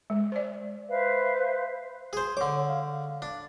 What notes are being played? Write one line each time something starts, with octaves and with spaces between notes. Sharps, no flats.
G#3
C5 D5
B4 C5 E5 F5
G#4 C5
D3 C#5 D6
F5
D4